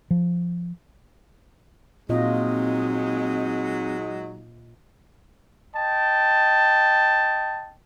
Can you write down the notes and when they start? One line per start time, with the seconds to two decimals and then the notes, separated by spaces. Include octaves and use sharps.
0.11 F3
2.09 A#2 F#3 G#3 C4 D#4 F4 D#5
5.76 D#5 G5 A5